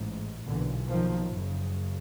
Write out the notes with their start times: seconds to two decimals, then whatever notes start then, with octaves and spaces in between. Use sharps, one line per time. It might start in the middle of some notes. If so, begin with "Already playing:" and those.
Already playing: A1 G#2
0.46 B1 A#2 D3 E3
0.90 D#3 F3
1.32 F#1 F#2 C#3